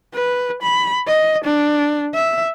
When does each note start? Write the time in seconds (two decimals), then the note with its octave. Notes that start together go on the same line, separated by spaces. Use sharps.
0.14 B4
0.62 B5
1.07 D#5
1.45 D4
2.15 E5